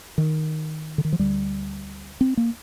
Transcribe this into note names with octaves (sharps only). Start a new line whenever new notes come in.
D#3
D3
D#3
F3
D2 D3 G3
C4
A#3